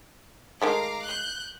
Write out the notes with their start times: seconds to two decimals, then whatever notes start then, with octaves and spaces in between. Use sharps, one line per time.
0.62 D#3 G#3 A3 F5 A#5 D6
1.03 F#6 G6